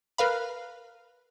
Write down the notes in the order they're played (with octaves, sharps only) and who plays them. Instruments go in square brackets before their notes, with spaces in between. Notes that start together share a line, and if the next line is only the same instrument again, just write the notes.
[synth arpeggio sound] A#4 B4 F5 B5